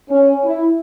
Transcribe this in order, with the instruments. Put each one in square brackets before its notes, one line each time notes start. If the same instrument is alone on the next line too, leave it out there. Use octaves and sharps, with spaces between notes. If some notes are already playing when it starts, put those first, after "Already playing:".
[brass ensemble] C#4
E4